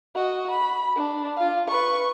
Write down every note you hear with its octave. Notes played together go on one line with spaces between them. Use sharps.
F#4 D#5
B5
D4
F4 F5
B4 C#6